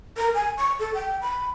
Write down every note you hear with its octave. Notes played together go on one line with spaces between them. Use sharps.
A#4
G#5
C#6
A4
G5
B5